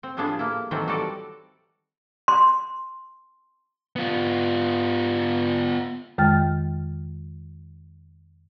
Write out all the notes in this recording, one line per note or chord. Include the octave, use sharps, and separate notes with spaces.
C4
A2 F3 G3 B3 D4 G#4
A#3 E4
D#3 E3 F#3 A3 C4
G3 F#4 A4 D5
C6
B3 F4
F2 D#3 G#3 G5 F6 A6